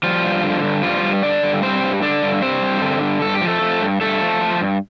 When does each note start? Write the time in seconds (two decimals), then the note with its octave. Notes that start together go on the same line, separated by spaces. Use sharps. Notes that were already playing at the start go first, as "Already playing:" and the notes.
0.03 F3 G3 F4
0.24 G2
0.44 D3
0.63 G2
0.83 F3 G3 F4
1.03 G2
1.23 D3 D4 D5
1.43 G2
1.62 G3 C4 C5
1.83 G2
2.02 D3 D4 D5
2.22 G2
2.42 G3 C4 C5
2.62 G2
2.82 D3
3.02 G2
3.22 G2 A4
3.35 G4
3.41 F3
3.47 A3 A4
3.62 F3
3.82 G2
4.01 G2 A3 A4
4.21 F3
4.41 F3
4.61 G2